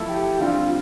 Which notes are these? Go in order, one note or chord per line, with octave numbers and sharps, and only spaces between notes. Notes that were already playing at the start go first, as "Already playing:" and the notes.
Already playing: F3 A3 E4 A4
G4
D3 G3 C4 F4